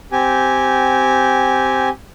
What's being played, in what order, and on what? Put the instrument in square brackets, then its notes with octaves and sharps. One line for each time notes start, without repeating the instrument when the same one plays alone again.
[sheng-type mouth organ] C4 G4 G#5